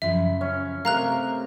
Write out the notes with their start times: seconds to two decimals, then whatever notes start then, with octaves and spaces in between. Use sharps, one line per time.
0.02 F#2 C#3 F3 E5
0.41 C#4
0.85 C3 A3 A#4 F5 A#5 F#6